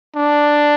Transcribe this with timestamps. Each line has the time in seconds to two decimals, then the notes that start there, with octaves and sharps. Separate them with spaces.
0.16 D4